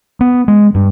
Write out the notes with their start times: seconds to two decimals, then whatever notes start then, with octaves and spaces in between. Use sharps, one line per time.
0.21 B3
0.48 G#3
0.75 G2